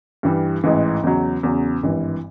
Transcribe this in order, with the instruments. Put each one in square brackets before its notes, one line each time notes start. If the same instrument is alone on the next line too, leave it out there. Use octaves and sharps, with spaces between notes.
[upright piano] G2 E3 G3
A1 G#2 E3
E2 C#3 F#3
E2 C#3 F#3
G#1 G2 E3